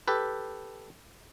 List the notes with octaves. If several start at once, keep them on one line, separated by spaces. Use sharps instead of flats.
G4 A4 B4